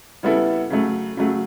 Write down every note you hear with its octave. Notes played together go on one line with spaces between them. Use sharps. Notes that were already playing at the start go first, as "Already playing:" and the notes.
C#3 G3 B3 E4 A4
C#3 F#3 A3
C#3 F#3 A3